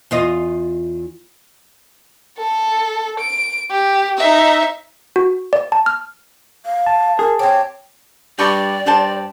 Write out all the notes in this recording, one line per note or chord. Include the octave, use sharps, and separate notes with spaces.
E2 F4 D#5
A4
D7
G4
D#4 E5
F#4
D5
A5
F6
F5
A5
G#4 A#4
C4 G4 C#5
G2 D5 G5 C#6
G2 G4 C5 A5